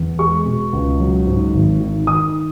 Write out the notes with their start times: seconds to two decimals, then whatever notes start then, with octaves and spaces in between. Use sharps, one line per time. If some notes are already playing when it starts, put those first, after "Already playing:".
Already playing: E2
0.19 G#3 C#6
0.45 B2
0.73 C#2
1.00 F#3
1.27 G#2
1.54 G#1
1.80 D#3
2.07 D#3 D#6